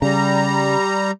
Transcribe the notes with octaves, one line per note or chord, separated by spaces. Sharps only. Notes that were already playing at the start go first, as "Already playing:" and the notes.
C#3 G3 A#5